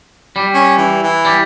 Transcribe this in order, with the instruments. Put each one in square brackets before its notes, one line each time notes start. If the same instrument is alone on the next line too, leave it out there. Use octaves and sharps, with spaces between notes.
[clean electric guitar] G3
[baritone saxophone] C#4
E3
E3
[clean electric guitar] G3